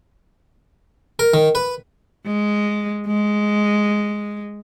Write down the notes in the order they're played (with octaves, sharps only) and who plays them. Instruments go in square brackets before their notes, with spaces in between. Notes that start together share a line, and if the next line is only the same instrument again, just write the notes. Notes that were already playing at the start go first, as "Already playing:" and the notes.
[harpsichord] A#4
D#3
B4
[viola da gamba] G#3
G#3